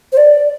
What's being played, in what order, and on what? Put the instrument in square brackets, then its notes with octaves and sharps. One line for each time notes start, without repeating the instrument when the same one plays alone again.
[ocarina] C5
D5